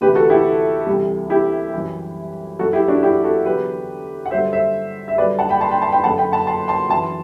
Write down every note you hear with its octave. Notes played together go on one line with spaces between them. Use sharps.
D2 C3 E3 G4 B4
F#4 A4
E4 G4
C2 C3 E3
E4 G4
F#2 E3
F#2 F#3 F#4 A4
E4 G4
D4 F#4
E4 G4
F#4 A4
E2 D3 F#3 G4 B4
F#5
G2 D3 F#3 C5 E5
C5 E5
E5
G2 D3 F#3 B4 D5
F#5 A5
G5 B5
A5 C6
G5 B5
A5 C6
G5 B5
F#2 D3 F#3 F#5 A5
G5 B5
F#5 A5
A5 C6
A5 C6
F#2 E3 A5 C6